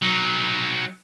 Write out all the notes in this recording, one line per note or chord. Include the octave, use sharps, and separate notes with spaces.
F#3 D#4